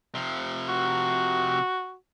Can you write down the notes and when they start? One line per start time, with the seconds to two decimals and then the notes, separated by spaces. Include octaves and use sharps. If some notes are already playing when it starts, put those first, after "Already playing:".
0.15 C3 F3
0.69 F#4